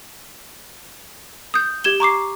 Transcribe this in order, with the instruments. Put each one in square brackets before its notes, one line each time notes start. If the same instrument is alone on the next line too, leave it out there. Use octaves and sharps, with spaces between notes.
[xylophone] D#6 G6
G4 G#6 E7 G7
A#5 C#6 D6 C7